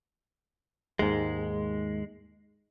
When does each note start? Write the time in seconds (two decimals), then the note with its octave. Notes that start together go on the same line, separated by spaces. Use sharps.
0.99 D#2 G#2 G#3